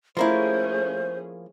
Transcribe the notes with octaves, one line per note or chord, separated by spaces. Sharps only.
F3 A3 A#3 C#4 E4 G#4 C5